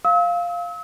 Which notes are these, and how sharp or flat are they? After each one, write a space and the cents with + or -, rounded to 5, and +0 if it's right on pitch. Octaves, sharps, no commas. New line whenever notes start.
F5 +0 E6 -40